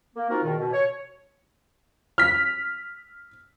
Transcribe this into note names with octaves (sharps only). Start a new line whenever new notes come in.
A#3
C4 D#4 F4 F#4 A#4
E2 B2 D#3
B2
C#5
F6 B6